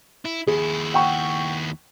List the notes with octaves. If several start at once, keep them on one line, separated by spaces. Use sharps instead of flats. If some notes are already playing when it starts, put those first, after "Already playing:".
E4
D#2 E4 G#4
F#5 G5 C#6